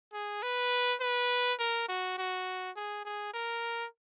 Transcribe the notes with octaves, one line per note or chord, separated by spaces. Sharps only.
G#4
B4
B4
A#4
F#4
F#4
G#4
G#4
A#4